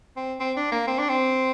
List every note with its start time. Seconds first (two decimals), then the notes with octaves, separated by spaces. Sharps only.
0.17 C4
0.40 C4
0.57 D4
0.72 A#3
0.87 C4
0.98 D4
1.09 C4